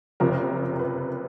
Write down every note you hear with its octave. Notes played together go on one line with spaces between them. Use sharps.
F#1 F2 C3 F3 A#4
A#4
B4